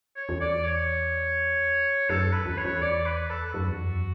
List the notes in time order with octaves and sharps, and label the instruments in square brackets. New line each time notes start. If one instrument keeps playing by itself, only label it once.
[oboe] C#5
[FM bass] E2
[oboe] D5
C#5
[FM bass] F#2 [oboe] A4
[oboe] B4
[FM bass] E2
[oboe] C#5
[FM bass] E2
[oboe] D5
B4
A4
[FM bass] F#2 [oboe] F#4
[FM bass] E2
F#2